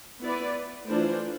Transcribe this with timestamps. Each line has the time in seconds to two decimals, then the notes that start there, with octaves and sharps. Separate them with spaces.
0.22 B3 E4 B4 D5
0.90 E3 A3 D4 F4 C5